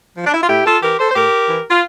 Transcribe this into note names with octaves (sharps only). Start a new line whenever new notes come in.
F3
D4
E4
F4
A2 E4 G4
F4 A4
E3 G4 A#4
A4 C5
C5
A2 G4 A#4
E3
F4